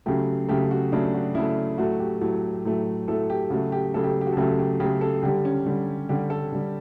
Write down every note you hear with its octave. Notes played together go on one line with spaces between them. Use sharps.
C#3 F#3 A3 G4
C#3 F#3 A3 G4
F#4
C#3 F#3 A3 D4
F#4
C#3 F#3 A3 E4
A2 F#3 A3 F#4
G4
A2 F#3 A3
A2 F#3 A3
A2 F#3 A3 A4
G4
C#3 F#3 A3 F#4
G4
C#3 F#3 A3 A4
G4
G4
F#4
A4
C#3 F#3 A3 G4
G4
C#3 F#3 A3 G4
A4
D3 G3 G4
C#4
D3 G3
D3 G3 G4
A4
D3 G3